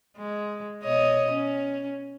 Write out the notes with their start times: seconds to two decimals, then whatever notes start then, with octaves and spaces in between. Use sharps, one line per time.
0.18 G#3
0.83 B2 C#5 D#5
1.31 C#4